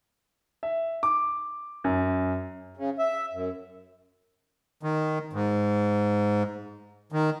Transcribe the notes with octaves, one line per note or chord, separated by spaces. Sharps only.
E5
D6
F#2
C#3
E5
F#2
D#3
G#2
D#3